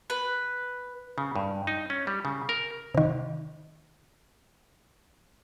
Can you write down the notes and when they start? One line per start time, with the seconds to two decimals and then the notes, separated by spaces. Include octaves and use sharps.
0.10 B4
1.18 C#3
1.36 G2
1.67 D#4
1.90 C#4
2.07 G3
2.25 C#3
2.49 A#4
2.95 C3 D#3